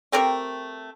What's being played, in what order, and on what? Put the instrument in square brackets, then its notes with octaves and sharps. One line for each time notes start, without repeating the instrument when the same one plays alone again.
[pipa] A3 C4 G4 A#4